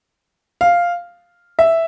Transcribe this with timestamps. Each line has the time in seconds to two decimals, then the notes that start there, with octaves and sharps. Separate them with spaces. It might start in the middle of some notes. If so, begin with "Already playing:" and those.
0.61 F5
1.59 E5